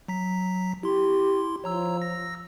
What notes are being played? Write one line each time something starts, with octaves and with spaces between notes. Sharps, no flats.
F#3 A#5 B6
E4 G4 C6
F3 C#5 A#5 E6
E6 A#6